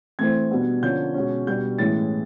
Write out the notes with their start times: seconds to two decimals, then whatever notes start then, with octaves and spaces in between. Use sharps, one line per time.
0.19 E3 A3 C4 G#6
0.51 B2 G3 B3 D4
0.82 D3 F3 A#3 C#4 G6
1.14 B2 G#3 C#4
1.47 B2 G3 B3 D4 G6
1.78 A2 E3 G#3 C#4 A6